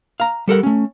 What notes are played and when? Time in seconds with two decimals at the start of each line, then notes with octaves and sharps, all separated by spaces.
0.20 F5 A#5
0.48 G3 A4 A#4 F#5
0.63 A3 C#4